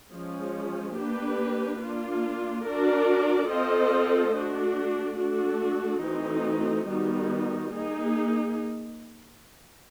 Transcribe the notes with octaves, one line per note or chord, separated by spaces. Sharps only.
F3 G#3 C#4
A#3 D4 G4 B4
A#3 D4 F4
D4 F#4 A#4 D5
C4 F4 A4 C5 D#5
A3 D4 F#4
A3 D4 F#4 A4
E3 A3 C4 D#4 F#4
D#3 G3 B3 D#4 F#4
A#3 D#4 G#4